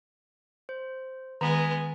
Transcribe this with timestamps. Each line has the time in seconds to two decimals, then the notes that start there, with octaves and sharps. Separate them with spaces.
0.69 C5
1.41 D#3 G#3 B3 A#5